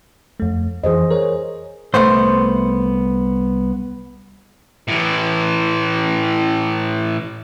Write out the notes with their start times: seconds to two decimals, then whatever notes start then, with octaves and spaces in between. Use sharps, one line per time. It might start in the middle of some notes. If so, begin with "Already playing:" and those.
0.40 F2 A3
0.84 F2 E3 G#4 C5 D#5
1.10 G#4 A#4 C#5
1.94 C2 A3 B3 C5
4.88 A2 E3